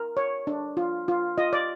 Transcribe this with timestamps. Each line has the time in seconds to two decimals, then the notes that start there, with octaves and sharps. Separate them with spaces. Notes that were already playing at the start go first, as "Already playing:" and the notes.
Already playing: A#4
0.17 C#5
0.47 D4
0.77 F4
1.08 F4
1.38 F4 D#5
1.53 D5